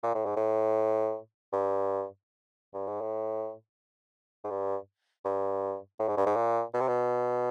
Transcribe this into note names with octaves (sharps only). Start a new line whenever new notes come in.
A#2
A2
G#2
A2
G2
G2
G#2
A2
G#2
G2
G2
A2
G#2
G2
G#2
A#2
B2
C3
B2